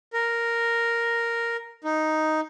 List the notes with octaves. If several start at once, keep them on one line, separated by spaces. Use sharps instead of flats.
A#4
D#4